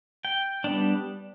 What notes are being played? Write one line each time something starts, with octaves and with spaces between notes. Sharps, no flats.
G5
G3 B3 D4